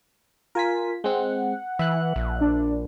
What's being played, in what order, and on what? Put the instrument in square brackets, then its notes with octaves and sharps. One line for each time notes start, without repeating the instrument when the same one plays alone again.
[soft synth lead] F4 [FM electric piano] A#4 G#5 B6
[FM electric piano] G#3 C4 [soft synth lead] F#5
[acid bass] E3 [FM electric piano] E5 F#6
[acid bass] A#1
[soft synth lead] D4